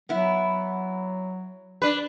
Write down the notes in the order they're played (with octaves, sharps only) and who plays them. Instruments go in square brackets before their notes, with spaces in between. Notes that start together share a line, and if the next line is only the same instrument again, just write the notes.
[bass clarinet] F#3 [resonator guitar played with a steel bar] B3 E4
[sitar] D4 B4